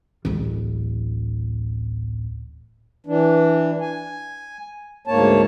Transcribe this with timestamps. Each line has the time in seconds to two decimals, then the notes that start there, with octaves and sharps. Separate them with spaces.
0.25 D1 A1
3.06 E3 D4
3.81 G#5
5.07 D2 G#2 A#3 C#5 A5